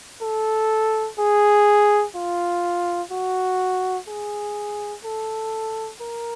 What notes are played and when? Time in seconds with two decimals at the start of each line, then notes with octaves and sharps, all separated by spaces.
0.22 A4
1.19 G#4
2.15 F4
3.11 F#4
4.08 G#4
5.04 A4
6.01 A#4